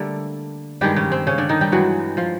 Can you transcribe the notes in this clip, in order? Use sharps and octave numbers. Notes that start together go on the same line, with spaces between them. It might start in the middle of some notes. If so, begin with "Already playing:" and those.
Already playing: D3 G3 A3 A#3 D4 A4
G2 D#3 G3 G#3 G4
C#3 C#4
C4
C#3 C#4
D3 D4
D#3 D#4
G3 G4
G2 E3 F#3 G#3 F#4
F3 F4